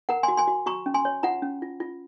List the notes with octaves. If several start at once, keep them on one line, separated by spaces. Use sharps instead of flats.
A#4 F#5 A#5
G#5 C6
F#4
G#5 C6
F#4
F#4 A#5 C#6
C#4
G#5 C6
C#5
F4 F#5 A#5
C#4
F4
F4